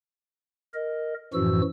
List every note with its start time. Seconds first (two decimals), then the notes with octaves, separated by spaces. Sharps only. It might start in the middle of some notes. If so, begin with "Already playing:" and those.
0.74 A#4 D#5
1.34 F#2 A2 E3 F3 F#4 E6